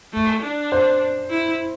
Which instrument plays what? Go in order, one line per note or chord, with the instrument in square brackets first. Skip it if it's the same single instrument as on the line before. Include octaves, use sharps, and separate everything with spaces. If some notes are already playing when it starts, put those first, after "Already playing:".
[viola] A3
D4
[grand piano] C5
[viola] E4